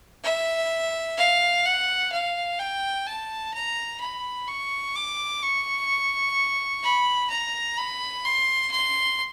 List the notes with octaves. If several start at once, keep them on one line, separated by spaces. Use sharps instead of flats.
E5
F5
F#5
F5
G5
A5
A#5
B5
C#6
D6
C#6
B5
A#5
B5
C6
C6